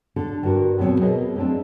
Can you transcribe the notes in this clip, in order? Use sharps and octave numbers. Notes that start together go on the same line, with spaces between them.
D3 A4
G2 F#4 A#4
D#2 B2 D#3 F#3 C4
B2 G#4 A#4 D#5
G3 A3 A#3 C4 D4